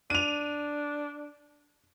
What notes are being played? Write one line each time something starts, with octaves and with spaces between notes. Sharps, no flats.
D4 D#7 F7